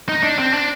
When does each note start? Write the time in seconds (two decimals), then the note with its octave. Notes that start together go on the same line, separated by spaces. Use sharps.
0.09 D#4
0.23 D4
0.39 C4
0.54 D4